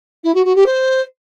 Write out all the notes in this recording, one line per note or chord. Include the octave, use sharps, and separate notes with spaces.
E4
F#4
F#4
G4
C5